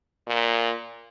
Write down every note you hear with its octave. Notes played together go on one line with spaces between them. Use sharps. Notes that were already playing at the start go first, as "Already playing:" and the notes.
A#2